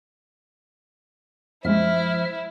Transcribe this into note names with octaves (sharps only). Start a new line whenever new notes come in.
F#2 A#2 F3 G#3 E4 E5 F6